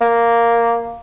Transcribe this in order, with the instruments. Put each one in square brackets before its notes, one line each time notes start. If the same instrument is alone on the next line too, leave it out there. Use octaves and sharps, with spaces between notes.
[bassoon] A#3